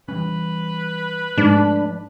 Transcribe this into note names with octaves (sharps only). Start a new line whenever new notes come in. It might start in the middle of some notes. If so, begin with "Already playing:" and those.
E3 G3 C#4 B4
G#2 F3 A3 D4